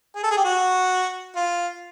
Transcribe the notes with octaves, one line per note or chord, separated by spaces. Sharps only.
G#4
A4
G#4
G4
F#4
F4